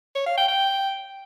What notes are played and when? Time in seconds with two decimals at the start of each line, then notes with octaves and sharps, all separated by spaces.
0.15 C#5
0.26 F5
0.37 G5
0.48 G5